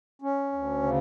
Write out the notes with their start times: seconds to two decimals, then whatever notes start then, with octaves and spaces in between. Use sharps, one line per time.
0.22 C#4
0.52 D2
0.83 C#3